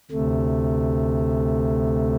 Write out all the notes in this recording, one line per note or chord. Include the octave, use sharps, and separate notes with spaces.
D2 C3 A3